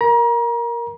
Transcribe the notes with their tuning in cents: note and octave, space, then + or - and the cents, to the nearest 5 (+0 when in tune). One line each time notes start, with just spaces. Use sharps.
A#4 +0 A#5 +35